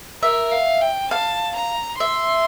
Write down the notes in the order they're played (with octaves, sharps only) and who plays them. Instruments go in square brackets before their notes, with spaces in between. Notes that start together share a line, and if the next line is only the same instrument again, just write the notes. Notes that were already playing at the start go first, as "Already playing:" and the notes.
[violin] A#4 [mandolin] E5
[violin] F5
G5
[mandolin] F5 [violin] A5
[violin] A#5
[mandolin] E5 [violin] C6